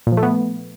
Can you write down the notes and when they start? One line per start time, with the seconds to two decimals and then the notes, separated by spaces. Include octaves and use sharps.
0.07 A#2
0.12 F3
0.17 A3
0.23 B3